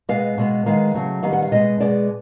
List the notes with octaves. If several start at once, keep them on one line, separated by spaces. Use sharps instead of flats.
B2 G#3 B3 F5
B2 G#3 B3
D#3 G#3 B3 F5
C#3 F#3 A3
D#3 G3 B3 F5
F#5
F5
B2 G#3 B3 D#5
B2 G#3 B3 D5